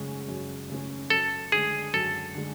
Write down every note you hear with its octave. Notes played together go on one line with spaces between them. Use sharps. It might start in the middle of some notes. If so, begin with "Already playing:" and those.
Already playing: F#2 C#3 G#3 C#4
F#2
C#3 G#3 C#4
F#2 A4
D3 G#3 G#4
F#2 A4
D3 G#3